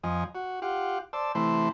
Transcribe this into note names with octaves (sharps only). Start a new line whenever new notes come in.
F2 F3 D#5 G#5
F#4
F4 G4 F#5
C5 D5 A5 E6
C3 E3 A3 E4 C5 C6